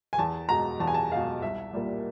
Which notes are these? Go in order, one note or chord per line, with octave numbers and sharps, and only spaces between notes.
G#5
E2 A5
B2 G#3 A#5
E2 A5
G#5
A5
B2 G#3 F5
C2 E5
A#2 G3 A#3